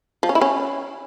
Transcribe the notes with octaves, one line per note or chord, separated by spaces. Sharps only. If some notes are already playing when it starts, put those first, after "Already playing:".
F3
C#4
E4
C#4